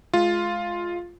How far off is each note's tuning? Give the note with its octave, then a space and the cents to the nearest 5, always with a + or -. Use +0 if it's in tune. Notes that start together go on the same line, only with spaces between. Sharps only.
G#3 +25 F4 +0